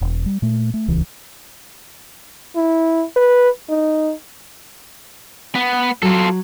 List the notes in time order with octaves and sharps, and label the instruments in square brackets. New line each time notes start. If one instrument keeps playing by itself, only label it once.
[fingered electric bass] E1
G3
A#2 A3
A3
D#1 C#2 E3
[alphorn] E4
B4
D#4
[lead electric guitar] B3
[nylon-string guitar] F#3 [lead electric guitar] F4 A4